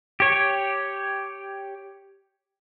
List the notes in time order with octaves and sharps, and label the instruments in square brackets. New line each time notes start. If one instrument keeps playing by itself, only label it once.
[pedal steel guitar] G4 C#5